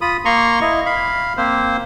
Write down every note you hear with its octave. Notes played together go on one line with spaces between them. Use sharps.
F4 B5 D#6
A#3 A#5 C6 C#6
E4 D#5
F5 B5
A#3 C4 C5